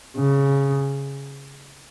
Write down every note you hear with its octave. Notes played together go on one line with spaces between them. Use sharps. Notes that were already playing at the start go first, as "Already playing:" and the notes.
C#3